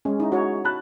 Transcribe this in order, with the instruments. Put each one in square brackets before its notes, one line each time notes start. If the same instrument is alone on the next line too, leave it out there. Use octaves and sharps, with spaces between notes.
[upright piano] G#3 [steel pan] C#4
[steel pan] D#4 E4
F#4 C#5
[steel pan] A5 [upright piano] B5 F#6